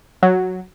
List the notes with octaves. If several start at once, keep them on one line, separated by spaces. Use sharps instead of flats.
F#3